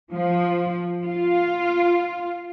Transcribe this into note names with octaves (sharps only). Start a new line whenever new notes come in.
F3
F4